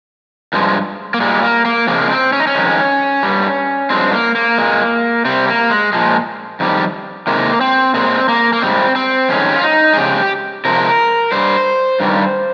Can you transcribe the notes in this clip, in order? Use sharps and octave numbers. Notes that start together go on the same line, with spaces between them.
G2 F3 G#3
A#3
A#2 G3 G#3
A#3
A#3
F2 C#3 F3 G#3 A#3
C4
C#4
D#4
C#4
F2 D#3 G#3
G2 G3
G2 F3 G#3 C4
A#3
A#3
A#2 G#3
C3 G3 C4
A#3
G#3
A#2 F3 G#3
F2 D#3 G3
C3 D#3 G#3 A#3
C4
A#2 G#3 C4
A#3
A#3
G#2 G3 C4
C4
F2 D#3 G#3 C#4
G4
F4
D#4
G#4
F2 C#3 G#3 G4
C3 F3 G#3 A#4
G2 G3 C5
G2 D#3 G3